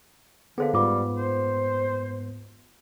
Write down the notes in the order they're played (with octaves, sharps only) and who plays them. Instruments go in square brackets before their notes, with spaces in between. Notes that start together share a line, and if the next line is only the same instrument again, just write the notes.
[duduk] D3 [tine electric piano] B3 [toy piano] G#4 C5 F5
[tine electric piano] G#2 B3 [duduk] G3 [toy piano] F4 D6
[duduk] C5